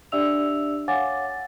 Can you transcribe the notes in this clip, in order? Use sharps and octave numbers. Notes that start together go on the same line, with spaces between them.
D4 G4 D5 E5 E6 F7
C#5 F5 F#5 G#5 D6 A6